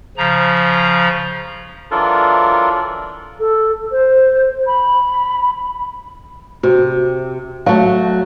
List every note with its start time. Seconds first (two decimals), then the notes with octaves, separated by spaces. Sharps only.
0.17 C#3 F3 A#5
1.91 E3 F#3 D4 F4 A4 A#4
3.39 A4
3.91 C5
4.67 B5
6.63 C3 F#4
7.66 F#3 A3 F5